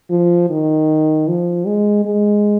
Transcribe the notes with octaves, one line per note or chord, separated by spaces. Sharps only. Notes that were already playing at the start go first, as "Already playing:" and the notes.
F3
D#3
F3
G#3
G#3